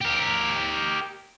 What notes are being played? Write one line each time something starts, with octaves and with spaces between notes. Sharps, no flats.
G4 A#4